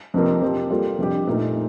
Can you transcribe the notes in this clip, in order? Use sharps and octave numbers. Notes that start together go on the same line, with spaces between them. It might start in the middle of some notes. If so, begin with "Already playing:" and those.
F2 C3 F3 A#3
F3 C4 G4
G3 A#3 F4 A4
F2 C3 G3 D4 G4
A#2 A3 D#4 A#4